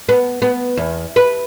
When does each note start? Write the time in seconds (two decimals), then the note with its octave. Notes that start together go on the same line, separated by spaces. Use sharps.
0.09 B3
0.42 B3
0.77 E2
1.16 B4